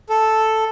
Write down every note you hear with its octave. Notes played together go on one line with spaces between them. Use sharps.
A4